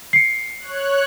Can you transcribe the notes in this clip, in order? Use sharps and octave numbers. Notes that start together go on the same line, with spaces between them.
C7 C#7
C#5 F#6